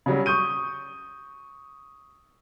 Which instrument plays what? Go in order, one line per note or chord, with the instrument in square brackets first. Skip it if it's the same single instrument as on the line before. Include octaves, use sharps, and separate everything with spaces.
[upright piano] C#3 F#3 G3
C#6 D#6 G6 D#7